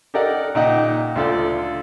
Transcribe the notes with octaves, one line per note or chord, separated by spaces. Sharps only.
G4 A4 A#4 D5 D#5 F#5
A#2 D#4 D#5 F#5 G5
D2 F4 A4 D5